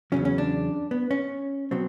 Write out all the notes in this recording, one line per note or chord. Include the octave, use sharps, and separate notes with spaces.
E2 C#3 F#3 C#4
C#4
D4
B3
C#4
B2 F#3 C4